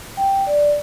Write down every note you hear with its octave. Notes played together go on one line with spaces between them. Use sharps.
G5
D5